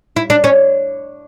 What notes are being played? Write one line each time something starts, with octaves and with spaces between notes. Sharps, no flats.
E4
D4
C#4